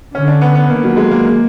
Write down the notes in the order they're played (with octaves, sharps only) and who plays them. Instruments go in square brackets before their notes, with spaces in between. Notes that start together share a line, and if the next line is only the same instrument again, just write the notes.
[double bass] D3 [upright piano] C#4
[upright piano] D4
B3
B3
[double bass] D#3 [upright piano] A#3
[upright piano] F#3
G#3
A#3